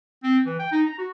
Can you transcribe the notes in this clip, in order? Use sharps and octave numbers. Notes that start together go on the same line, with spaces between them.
C4
E3
G5
D#4
A#5
F#4